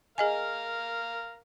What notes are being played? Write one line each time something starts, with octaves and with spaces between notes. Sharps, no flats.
G#4 A#4 D#5 F5 G#5